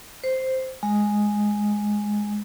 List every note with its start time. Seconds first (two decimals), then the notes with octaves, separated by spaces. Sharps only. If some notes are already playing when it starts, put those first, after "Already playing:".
0.24 C5
0.83 G#3